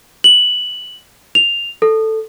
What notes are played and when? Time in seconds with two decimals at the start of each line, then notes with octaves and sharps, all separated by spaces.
0.24 F#7
1.35 F7
1.82 A4